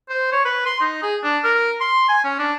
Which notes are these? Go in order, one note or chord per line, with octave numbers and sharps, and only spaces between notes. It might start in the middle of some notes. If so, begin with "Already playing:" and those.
C5
C#5
B4
C6
D#4
G#4
D4
A#4
C6
G#5
C#4
D4